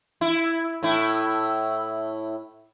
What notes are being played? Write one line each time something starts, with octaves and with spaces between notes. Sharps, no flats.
E4
A2 E4